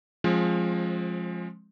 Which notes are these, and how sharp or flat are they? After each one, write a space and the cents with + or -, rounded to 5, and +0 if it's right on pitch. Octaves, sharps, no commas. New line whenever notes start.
F3 +5 G#3 +5 C4 +35